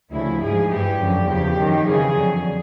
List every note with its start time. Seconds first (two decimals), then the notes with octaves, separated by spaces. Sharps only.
0.13 D2 C#3 F3 E4
0.41 G#2 F3 G#4
0.70 G2 E3 G4
0.99 F#2 D3 F3
1.28 E2 C#3 F3 G4
1.56 F#2 D#3 F#3
1.84 F2 C#3 E3 G#4
2.14 F2 D3 F#3